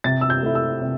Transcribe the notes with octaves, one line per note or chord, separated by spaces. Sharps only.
C3 A6
E6
G6
A3 E4
E6
C3